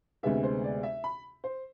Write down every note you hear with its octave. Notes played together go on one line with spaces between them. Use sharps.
D2 C3 G#3 B3 E5
C5
D5
E5
B5
C5